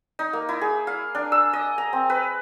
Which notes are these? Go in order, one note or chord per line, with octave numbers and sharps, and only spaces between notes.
D#4
A#3
E4
G#4
F5
D4
E6
D#5
A#5
C4
B4